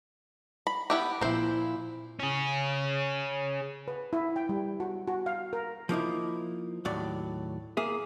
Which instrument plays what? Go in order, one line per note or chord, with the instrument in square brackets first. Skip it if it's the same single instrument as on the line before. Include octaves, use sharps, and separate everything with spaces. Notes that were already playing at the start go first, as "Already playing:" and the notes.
[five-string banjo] B5
B3 E4 G4
[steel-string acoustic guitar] A#2 F3 E4 [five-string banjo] C4 C5
[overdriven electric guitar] C#4 G#4
[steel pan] B4
E4
G5
G3
F#4
F#4
F5
A#4
[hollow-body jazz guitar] F3 A#3 D#4 E4
D#2 A2 F#3 D5
A#3 G#4 E5